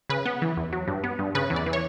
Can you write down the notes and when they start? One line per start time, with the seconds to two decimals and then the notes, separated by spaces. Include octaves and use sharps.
0.10 C#3 B4
0.26 B3
0.42 E3
0.57 E2
0.73 F#3
0.87 G2
1.04 B3
1.19 G2
1.35 C#3 B4
1.50 E2
1.56 D5
1.66 E3
1.73 C#5